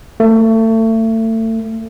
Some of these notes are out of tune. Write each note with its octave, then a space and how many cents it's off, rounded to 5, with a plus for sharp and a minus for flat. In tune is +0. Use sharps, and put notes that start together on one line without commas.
A3 +30